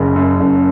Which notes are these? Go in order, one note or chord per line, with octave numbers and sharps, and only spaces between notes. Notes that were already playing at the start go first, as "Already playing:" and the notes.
Already playing: F#1 C#3
F#2
F#1